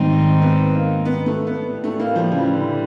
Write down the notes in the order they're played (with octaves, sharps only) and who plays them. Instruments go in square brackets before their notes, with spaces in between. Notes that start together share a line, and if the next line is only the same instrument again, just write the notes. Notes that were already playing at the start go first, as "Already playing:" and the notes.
Already playing: [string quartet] G#2 D#3 G3 C4 D#4
[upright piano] B3
A#3
B3
A3
B3
[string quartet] A2 E3 G3
[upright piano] A3
A#3
F3
C#3
D3